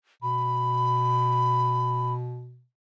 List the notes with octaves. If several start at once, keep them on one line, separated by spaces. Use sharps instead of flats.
B2 B5